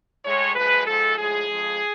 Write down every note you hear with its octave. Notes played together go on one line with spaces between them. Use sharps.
A2 G#3 C#5
F#2 F3 G#3 B4
G#2 F3 G#3 A4
A2 F3 G#3 G#4
F2 F3 G#3